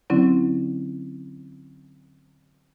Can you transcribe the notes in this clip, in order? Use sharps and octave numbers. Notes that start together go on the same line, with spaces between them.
D3 F#3 C4 C#4 E4